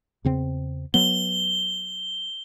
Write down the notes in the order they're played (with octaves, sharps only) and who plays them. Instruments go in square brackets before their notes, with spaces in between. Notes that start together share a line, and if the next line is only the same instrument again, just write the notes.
[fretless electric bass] E2 C#3 C4
[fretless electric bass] F#3 B3 [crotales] G7